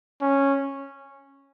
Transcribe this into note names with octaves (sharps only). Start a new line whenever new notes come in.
C#4